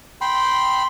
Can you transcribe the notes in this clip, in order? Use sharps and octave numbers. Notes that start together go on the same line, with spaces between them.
G5 B5 C6